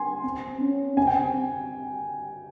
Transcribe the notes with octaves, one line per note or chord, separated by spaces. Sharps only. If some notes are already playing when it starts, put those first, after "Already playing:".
Already playing: G#5 C6
C4
C#4
C4 G#5
G5